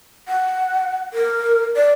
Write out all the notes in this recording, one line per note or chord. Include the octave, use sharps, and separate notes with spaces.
F#5
A#4
D5